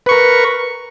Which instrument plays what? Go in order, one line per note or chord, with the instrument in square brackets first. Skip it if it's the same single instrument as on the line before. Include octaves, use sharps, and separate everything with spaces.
[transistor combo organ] B4
C#6
A#4